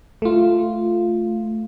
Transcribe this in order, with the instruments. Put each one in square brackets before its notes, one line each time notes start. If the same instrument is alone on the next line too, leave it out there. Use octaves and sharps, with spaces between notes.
[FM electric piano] A3 F4